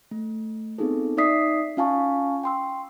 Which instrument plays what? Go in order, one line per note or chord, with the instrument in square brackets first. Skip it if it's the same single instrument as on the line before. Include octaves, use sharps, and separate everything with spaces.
[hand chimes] A3
B3 C4 D#4 F4 G#4 A4
D#4 D5 E5 D#6 B6 C7
C#4 F4 F5 G#5 A5 C#6
G5 C6 E6